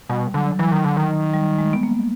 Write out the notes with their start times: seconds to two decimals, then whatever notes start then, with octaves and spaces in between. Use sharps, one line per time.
0.09 B2 G3
0.34 D3 F#3
0.59 E3 F#3
0.71 D#3
0.84 D3
0.96 D#3
1.34 G3
1.59 G#3
1.73 B3
1.83 A#3